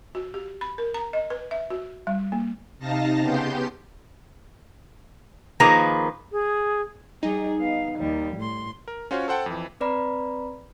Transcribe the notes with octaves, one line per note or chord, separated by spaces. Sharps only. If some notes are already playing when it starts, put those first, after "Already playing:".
F#4
G4
B5
A#4
A#5
D#5
B4
E5
F#4
G3
A#3
C3 D#4 F5 A5 A#6
C#3 B3 G4 C6 G6
D#3 F3 A#3 G#4 B4 A#5
G#4
G3 D#4 G#4
B3 F5
D#2 G3
A2 C6
A#4
C#4 F4 F#4 C5 C#5
A4 C5 F#5 G5 A5
F2 E3
C4 B4 D5 A#5 B5